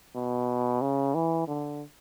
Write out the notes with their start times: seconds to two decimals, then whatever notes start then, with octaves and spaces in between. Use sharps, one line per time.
0.15 B2
0.81 C#3
1.14 E3
1.47 D3